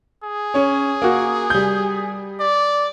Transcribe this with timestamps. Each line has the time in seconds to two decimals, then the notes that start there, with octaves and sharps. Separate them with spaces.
0.24 G#4
0.54 C#4 C#5
1.02 A#3 F#4
1.50 G3 G6
2.40 D5